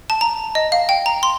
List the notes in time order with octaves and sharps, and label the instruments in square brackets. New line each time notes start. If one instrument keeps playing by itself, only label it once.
[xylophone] A5
A#5
D#5
F5
G5
A#5
C6